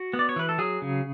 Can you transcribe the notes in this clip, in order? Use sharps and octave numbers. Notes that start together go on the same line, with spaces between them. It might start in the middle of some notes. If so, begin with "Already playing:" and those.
Already playing: F#4
B3
D5
C#5
E3 B4
A4
F#3 G#4
C#3